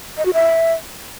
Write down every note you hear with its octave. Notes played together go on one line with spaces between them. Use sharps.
D#5
F#4
E5